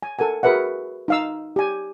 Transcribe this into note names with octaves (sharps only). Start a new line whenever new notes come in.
G#5
A4 A#4 F#5 G#5
F#4 G#4 A#4 B4 E5 F#5
D#4 F5 E6
G4 G#5